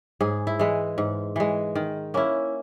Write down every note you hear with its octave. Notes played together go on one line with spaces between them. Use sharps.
G#2 G#4
E4
E3 G#3
G#2
E3 G#3
D#3
A#3 C#4 E4